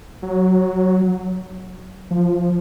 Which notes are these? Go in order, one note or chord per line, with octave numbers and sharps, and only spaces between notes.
F#3
F3